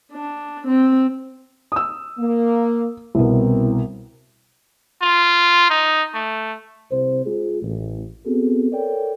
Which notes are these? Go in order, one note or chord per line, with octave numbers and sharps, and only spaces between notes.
D4
C4
D#6 E6
A#3
C2 B2 C4 E4 A#4
F4
D#4
A3
C2 C5
G#3 F4 G#4
A1
B3 C4 F#4 G#4 A4
A4 A#4 C#5 D5 G5